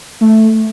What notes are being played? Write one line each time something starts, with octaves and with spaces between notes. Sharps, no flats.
A3